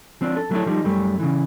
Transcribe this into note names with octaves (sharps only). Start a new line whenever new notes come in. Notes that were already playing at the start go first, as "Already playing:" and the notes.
F3 C4 D4
A4
F#3 A3 D4 E4 A4
F3 G3 D#4
F#2 G3 A3
C#3 E3